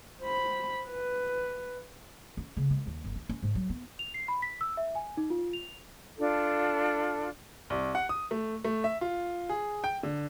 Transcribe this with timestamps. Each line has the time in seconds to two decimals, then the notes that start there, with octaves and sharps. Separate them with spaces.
0.21 C5 B5
0.89 B4
2.37 C#4
2.57 C#3
2.70 G#3
2.87 D#2
3.04 G1
3.16 C#4
3.29 C#4
3.43 G#2
3.55 F#3
3.69 B3
3.99 F7
4.14 C7
4.28 B5
4.42 B6
4.61 E6
4.77 E5
4.95 G#5
5.17 D#4
5.30 F4
5.53 F7
6.18 D4 F4 A4
7.70 C2
7.95 F#5
8.09 D#6
8.31 A3
8.65 A3
8.84 E5
9.01 F4
9.49 G#4
9.84 G5
10.03 D3